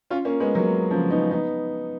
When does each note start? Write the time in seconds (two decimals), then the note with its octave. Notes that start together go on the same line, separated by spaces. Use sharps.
0.11 C#4 F4
0.25 A#3 C#4
0.40 G#3 B3
0.55 F#3 A#3
0.91 C#3 F3
1.10 B3 D#4
1.31 B3 D#4